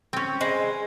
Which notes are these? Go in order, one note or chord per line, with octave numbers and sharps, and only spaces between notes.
C4 C#4
G#3 B4 C5